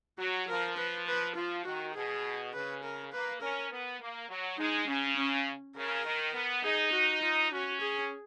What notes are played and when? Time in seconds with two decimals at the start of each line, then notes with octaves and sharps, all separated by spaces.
0.19 F#3 F#4
0.48 F3 A#4
0.77 B4
1.07 B4
1.36 F3 F4
1.65 D#3 F#4
1.95 B2 G#4
2.54 C#3 B4
2.83 A#4
3.12 A#3 B4
3.41 C#4 A#4
3.71 B3
4.00 A#3
4.29 F#3
4.58 G#3 D#4
4.87 C#3 C#4
5.17 C#4
5.76 C#3 A#4
6.05 D#3
6.34 B3
6.64 D#4 G#4
6.93 F#4
7.23 F4
7.51 C#4 F#4
7.81 G#4